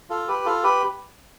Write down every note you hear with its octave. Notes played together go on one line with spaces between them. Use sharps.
F4 A4
G4 B4
F4 A4
G4 B4